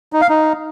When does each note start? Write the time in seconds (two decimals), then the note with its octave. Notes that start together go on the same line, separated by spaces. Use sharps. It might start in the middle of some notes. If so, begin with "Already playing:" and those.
0.13 D#4
0.21 F5
0.30 D#4